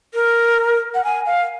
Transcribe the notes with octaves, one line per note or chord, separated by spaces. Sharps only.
A#4
F#5
G#5
F5